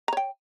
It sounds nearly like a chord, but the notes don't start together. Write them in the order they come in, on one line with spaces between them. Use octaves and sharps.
A#5 C#5 G5